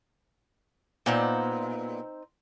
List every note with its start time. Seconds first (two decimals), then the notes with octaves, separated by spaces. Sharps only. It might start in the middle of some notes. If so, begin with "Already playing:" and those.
1.06 A#2 B3 C4 D#4 C5